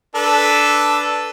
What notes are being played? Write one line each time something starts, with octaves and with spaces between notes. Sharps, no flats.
D4 A4 B4